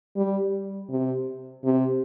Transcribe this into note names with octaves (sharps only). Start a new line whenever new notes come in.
G3
C3
C3